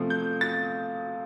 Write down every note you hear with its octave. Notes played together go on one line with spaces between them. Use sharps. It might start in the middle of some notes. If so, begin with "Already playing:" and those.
Already playing: C3 F3 A3
G6
A6